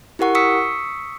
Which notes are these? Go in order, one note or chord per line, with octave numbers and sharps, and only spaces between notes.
E4 G4 A#4 F#5 C#6
C#6 D#6 E6 B6 C#7